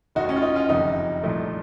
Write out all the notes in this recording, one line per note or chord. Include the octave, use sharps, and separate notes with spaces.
F1 D#2 D#3 D#4 F#4
C#4
F4
D#4
C#4 F4
F#1 F2 C3 D#3 D#4
C2 A#2 F3 A3